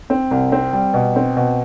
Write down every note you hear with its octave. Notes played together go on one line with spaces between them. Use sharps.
C4
C2
C4
G3
B2
C4
B2